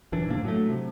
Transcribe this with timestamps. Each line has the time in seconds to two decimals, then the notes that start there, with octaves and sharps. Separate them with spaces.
0.12 D#1 F#2 E3 D4
0.30 A2 C3 A#3 D4
0.45 F#3 A3
0.70 C3